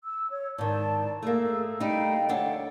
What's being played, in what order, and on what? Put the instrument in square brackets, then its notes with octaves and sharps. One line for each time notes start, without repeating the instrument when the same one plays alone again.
[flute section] E6
C#5
[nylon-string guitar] G#2 D#3 [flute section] D5 A5
[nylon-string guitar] A3 A#3 [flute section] G#4 E6
[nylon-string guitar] G3 A3 D#4 [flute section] D#5 F5 G5
[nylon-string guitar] D2 D4 A4 [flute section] C#5 F#5